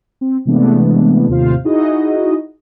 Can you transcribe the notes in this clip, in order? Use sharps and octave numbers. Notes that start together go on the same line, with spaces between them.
C4
C3 E3 G#3 A3 B3 D4
D#2 A2 C3 F4 C5 F5
D#4 E4 F#4 G#4 D#5